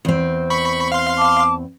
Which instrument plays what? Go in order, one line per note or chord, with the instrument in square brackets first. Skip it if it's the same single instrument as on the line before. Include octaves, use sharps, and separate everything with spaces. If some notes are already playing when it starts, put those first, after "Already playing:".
[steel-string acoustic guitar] E2 C4
[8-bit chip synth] B5 C#6
F5 C6
[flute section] A5 D6